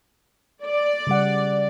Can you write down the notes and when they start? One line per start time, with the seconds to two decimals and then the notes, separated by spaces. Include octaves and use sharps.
0.64 D5
1.07 C#3 G3 F#5